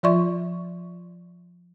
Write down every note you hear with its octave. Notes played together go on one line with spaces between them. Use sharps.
F3 F4 D5 E5 C6 C#6